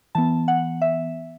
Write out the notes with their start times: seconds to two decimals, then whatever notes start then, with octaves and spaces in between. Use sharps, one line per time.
0.15 E3 B3 A5
0.48 F#5
0.82 E5